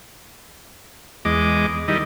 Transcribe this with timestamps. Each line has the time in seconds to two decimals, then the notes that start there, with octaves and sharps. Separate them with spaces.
1.25 E2 G#3 D#5 D6
1.88 D#3 G3 E4 D#5